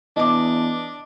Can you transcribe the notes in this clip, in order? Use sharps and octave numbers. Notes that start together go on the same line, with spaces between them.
E2 D4 D#5 D6